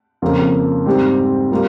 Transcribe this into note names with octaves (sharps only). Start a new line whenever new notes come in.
F2 C#3 F3 A#3
G#2 G3 C4 G4
G3 A#3 F4